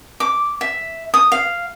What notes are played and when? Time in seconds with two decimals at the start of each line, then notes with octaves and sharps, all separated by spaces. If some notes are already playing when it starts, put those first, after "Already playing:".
0.20 D6
0.61 E5
1.14 D#6
1.32 F5